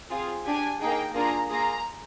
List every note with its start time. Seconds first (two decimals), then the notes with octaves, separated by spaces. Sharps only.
0.10 C4 F4 G#4
0.45 D4 G4 G#5
0.80 A#3 D#4 G#4 G5
1.15 A#3 D4 F4 G#4 A#5
1.49 A#3 F4 G#4 A#5